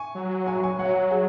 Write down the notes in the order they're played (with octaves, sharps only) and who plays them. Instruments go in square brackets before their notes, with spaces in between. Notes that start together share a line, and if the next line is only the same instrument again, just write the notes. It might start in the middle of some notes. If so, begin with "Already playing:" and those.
Already playing: [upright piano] G#5 C#6
[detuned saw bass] F#3
[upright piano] G#5 C#6
G#5 C#6
[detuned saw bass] F#3 [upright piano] C#5 F#5
[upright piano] G#4 C#5